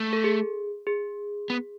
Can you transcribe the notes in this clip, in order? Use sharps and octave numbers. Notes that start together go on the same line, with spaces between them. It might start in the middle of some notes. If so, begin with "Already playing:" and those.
Already playing: A3
A4
G#4
G#4
B3